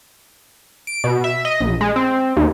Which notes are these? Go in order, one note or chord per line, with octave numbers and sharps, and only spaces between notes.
D7
B2
E5
D#5
A#1
G#3
C4
D#2